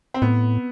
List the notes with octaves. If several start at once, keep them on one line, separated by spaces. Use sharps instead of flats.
C4
A2 B3